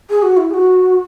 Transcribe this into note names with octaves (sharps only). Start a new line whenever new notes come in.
G#4
F#4
E4
G#4
F#4